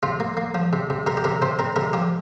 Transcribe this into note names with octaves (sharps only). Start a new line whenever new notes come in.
C3 F4
A#3
A#3
F3
C3
C3
C3 A#4
G4
C3 A#4
C3 C5
C4 A#4
C3 A#4
F3 G4